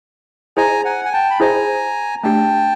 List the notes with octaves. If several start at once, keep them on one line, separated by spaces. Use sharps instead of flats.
E4 G#4 C5 D#5 G#5 A#5
F#5 G#5
G#5
G5 A5
B5
E4 G#4 C5 D#5 G#5 A#5
A3 D4 G4 G5 A5